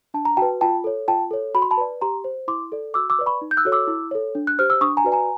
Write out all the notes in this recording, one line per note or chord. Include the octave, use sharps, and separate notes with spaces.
D4 A5
A#5
F#4 B4 G5 A5
F4 G5 A5
A4 C#5
F4 G5 A5
A4 C#5
F#4 B5
C6
A5 B5
B4 D5
G4 A#5 C6
C5
E4 C6 D6
A4 D5
F#4 D6 E6
D6 E6
B4 D5
B5 C#6
D#4
G6
E6 F#6
F#4 A4 C#5
D6 E6
E4
A4 C#5
D4
F#6
G4 C5 F6
E6
D4 C#6 D#6
G#5 A#5
F#4 B4 D5
G#5 A#5